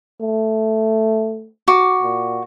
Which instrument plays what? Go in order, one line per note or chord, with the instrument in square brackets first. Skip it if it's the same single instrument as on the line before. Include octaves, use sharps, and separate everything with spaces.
[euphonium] A3
[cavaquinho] F#4 D6
[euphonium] A#2